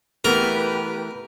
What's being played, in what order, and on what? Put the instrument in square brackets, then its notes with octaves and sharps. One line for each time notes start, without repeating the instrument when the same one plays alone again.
[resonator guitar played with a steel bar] E3 A3 B3 [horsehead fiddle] G4 B4 [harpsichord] A#4